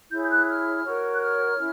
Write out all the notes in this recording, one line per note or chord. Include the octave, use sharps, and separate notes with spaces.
E4 G#4 C#5 G6
G6
F#6
F6
F#4 A#4 C#5
F#6
F6
C#4 E4